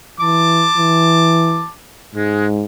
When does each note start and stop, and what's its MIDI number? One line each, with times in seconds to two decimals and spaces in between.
0.21 0.67 52
0.21 1.69 81
0.21 1.69 86
0.77 1.64 52
2.15 2.65 44
2.15 2.45 56